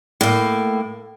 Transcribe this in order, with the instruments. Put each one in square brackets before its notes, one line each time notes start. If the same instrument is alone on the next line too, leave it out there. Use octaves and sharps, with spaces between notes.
[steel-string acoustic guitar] A2 A#3